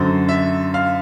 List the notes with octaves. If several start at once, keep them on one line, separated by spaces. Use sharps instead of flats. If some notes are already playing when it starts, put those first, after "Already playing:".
Already playing: F#2 D3 F#3 C5
E5
F5